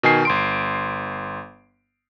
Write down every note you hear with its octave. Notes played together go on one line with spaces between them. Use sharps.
B2 D#3 G#5 C7
G1 C6 D7